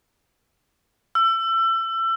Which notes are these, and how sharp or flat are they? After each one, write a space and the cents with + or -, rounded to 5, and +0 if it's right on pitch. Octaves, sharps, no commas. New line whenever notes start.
E6 +25